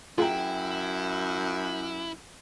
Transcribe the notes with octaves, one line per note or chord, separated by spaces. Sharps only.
F#2 E4 F4 G#4 F5 G5 A#5